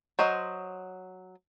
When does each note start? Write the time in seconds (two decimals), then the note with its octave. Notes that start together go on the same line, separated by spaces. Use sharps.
0.19 F#3 C5 D#5